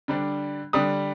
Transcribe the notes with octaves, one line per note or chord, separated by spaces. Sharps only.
D3 G3 D4
D3 G3 D4 D#6